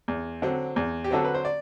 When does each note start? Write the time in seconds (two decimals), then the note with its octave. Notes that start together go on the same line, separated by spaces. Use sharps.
0.08 E2
0.42 D3 F#3 C4
0.76 E2
1.04 G4
1.11 D3 F#3 C4 A4
1.25 B4
1.35 C5
1.45 D5